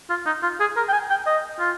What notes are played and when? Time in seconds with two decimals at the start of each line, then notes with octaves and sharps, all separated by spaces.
0.10 F4
0.26 D#4
0.43 F4
0.60 G#4
0.77 A#4
0.89 G5
0.93 G#5
1.10 G5
1.26 D#5
1.60 F4